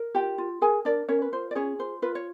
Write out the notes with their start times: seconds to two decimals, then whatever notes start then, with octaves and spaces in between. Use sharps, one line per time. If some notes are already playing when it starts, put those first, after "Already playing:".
Already playing: A#4
0.15 F4 G4 G5
0.38 F4
0.61 G#4 A#4 G#5
0.85 D4 A#4 D5
1.09 C#4 A#4 C#5
1.22 B4
1.32 F4 C5
1.51 D5
1.55 C#4 G#4 C#5
1.79 F4 C5
2.02 F4 B4
2.15 C#5